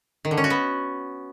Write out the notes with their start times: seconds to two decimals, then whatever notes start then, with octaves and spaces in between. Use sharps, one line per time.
0.25 D#3
0.31 D3
0.37 C#4
0.44 F#4
0.50 B3